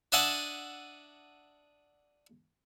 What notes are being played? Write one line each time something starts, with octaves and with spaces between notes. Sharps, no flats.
D4 D#5 E5 F#5 G#5 A5